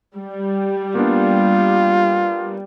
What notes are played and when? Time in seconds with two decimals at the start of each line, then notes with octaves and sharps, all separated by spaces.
0.17 G3
0.95 A#3 B3 D4 F4